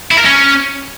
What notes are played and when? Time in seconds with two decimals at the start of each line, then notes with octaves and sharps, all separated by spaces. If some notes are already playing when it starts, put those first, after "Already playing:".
0.11 E4
0.18 A#4
0.25 C#4